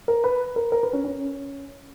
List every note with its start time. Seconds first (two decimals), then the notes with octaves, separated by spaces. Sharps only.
0.08 A#4
0.24 B4
0.56 A#4
0.72 A#4
0.83 B4
0.93 C#4
1.04 C#4